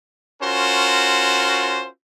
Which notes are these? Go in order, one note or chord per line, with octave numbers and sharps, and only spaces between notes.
C#4 F4 F#4 A#4 C5